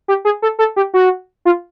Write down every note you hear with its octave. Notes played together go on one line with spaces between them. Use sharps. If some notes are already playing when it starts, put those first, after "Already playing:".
G4
G#4
A4
A4
G4
F#4
F4